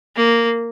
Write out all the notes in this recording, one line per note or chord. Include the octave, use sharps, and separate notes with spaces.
A#3